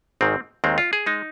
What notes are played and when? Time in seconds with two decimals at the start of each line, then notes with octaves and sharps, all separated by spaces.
0.21 G#1 G#2 D#3 C4
0.64 D#2 D#3 G#3 C4
0.78 F4
0.93 G#4
1.06 G#3 D#4